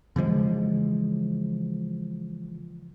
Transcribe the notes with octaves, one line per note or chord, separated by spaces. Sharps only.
C#3 E3 F3 G#3